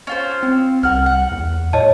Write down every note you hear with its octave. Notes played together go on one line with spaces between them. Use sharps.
C#4 F4 C5
C4
C2 A#4 F#5 F6
F#5
E2
A2 C#5 D#5 A5